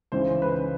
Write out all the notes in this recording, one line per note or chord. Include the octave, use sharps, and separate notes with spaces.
C#2 C#3 E3 C5
B4